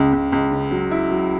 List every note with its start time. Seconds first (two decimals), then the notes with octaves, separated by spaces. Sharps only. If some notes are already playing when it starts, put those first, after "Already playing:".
Already playing: C#2 C#3
0.13 C#2
0.32 C#2
0.52 C#3
0.71 F#3
0.91 E4
1.11 F#3